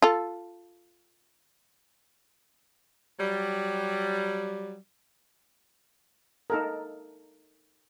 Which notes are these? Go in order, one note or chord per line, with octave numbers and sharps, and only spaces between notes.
F4 A4
F#3 G3
D#4 A4 A#4